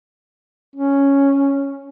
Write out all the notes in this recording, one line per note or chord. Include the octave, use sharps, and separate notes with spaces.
C#4